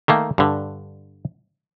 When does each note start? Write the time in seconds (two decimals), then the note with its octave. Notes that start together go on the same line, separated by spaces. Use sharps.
0.08 D#3 A3 A#3
0.38 G2 D3